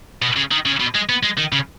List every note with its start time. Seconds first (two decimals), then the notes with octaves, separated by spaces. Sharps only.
0.22 B2
0.36 C#3
0.51 D#3
0.66 C#3
0.80 B2
0.95 G#3
1.09 B3
1.23 G#3
1.38 D#3
1.52 C#3